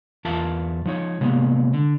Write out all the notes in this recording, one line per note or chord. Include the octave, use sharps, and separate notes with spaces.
E2 F4 A#4 E5 F5 A5
F3 D#4 C#5
C3 G#3 A#3 B3
D3